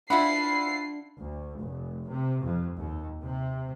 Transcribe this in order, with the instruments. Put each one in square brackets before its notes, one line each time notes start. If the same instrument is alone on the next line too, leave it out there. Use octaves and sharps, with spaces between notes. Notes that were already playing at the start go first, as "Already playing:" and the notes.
[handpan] D4 [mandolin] E4 B5 [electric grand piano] F4 E5 F#5 [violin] C7
[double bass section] D2
F1
C3
F2
D#2
C3